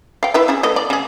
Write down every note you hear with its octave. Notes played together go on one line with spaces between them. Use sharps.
F5 G5
E4 B4 E5
C#4 E4 G#4
A3 B4 D#5
D5
C#3 G#4